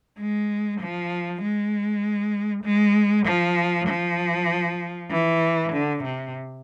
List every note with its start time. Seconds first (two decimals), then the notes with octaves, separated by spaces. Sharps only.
0.19 G#3
0.81 F3
1.42 G#3
2.64 G#3
3.26 F3
3.88 F3
5.10 E3
5.73 D3
6.03 C3